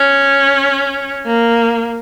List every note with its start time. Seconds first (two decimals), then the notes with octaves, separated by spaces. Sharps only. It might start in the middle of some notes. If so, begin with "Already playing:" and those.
Already playing: C#4
1.26 A#3